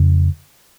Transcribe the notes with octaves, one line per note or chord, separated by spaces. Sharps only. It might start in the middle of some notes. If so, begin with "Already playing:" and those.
Already playing: F2 C#3